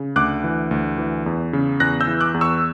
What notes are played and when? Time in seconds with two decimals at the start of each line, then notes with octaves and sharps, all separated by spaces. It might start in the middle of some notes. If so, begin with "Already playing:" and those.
Already playing: C#3
0.16 D2 D6 F#6
0.44 E3
0.71 D2
0.98 E3
1.26 E2
1.53 C#3
1.80 E2 F#6 A#6
2.01 E6 G6
2.07 E3
2.21 D6 F#6
2.34 E2
2.41 C#6 E6